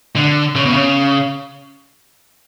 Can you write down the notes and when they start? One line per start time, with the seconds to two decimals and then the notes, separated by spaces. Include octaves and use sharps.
0.16 D3
0.56 C#3
0.65 B2
0.74 C#3